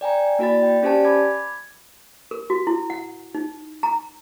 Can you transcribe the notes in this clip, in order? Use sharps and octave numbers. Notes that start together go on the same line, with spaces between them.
D5 G5 G#5 A#5
A#3 E4 F#4 D5 B5 A6
G5
C#4 G4 C5 D5 G#5 A5
B5 D6 G#6
A#4
F#4
E4
F#5
D#4
A#5